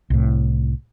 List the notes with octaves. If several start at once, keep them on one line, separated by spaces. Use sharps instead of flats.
C2 A2